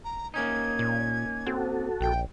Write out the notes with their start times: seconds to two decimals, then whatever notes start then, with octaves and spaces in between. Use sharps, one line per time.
0.04 A#5
0.34 A#3 C#4 D#4 G#6
0.79 A#2
1.46 C4 F#4 A4
2.01 A#1 G5